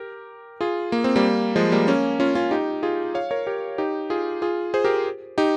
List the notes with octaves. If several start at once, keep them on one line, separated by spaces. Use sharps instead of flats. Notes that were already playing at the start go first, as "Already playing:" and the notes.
Already playing: G4 A#4
F4 G#4
A#3
C4
G3 A#3
F3 G#3
G3 A#3
A#3 C#4
C#4 F4
C#4 F4
D#4 G4
F4 G#4
C#5 F5
A#4 C#5
G4 A#4
D#4 G4
F4 G#4
F4 G#4
G#4 C5
G4 A#4
D#4 G4